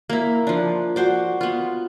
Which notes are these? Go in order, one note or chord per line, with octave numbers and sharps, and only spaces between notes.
A#3 E4
F3 D4
F#4 C5 D5
B3 F4